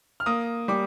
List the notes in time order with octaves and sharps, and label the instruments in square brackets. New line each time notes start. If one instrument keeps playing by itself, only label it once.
[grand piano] F6
A#3 D#6
G3 D6